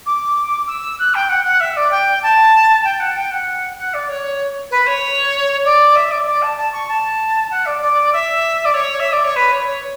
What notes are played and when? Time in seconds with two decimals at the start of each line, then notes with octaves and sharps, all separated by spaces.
0.06 D6
0.67 E6
0.99 F#6
1.14 G5
1.29 F#5
1.44 F#5
1.60 E5
1.76 D5
1.91 G5
2.22 A5
2.84 G5
2.99 F#5
3.15 G5
3.30 F#5
3.77 F#5
3.93 D5
4.08 C#5
4.70 B4
4.86 C#5
5.64 D5
5.95 E5
6.10 D5
6.26 D5
6.42 A5
6.57 A5
6.72 C#6
6.88 A5
7.50 F#5
7.65 D5
7.81 D5
8.12 E5
8.64 D5
8.74 C#5
8.99 E5
9.12 D5
9.23 C#5
9.36 B4
9.51 C#5
9.67 C#5